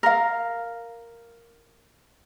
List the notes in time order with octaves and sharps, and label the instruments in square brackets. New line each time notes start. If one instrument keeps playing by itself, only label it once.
[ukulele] A#4 F5